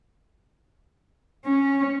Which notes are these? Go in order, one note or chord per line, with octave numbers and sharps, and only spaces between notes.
C#4